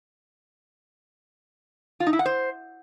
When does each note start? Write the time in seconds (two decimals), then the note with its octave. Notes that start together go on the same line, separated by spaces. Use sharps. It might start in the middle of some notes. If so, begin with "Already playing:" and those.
2.00 F4
2.07 D#4
2.13 E4
2.19 F#5
2.26 C5